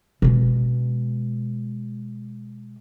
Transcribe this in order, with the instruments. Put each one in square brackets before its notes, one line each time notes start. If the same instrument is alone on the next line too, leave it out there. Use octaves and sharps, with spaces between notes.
[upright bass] B2 G#3